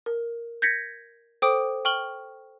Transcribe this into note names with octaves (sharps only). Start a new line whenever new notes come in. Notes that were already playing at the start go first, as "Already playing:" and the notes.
A#4
G6 G#6 A#6 B6 C#7
A4 C5 G5 D6 D#6 D7
G5 C#6 F6 F#7 G7